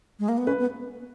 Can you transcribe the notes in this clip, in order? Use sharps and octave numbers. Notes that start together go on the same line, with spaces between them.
G#3
A#3
B3
C#4 B4
B3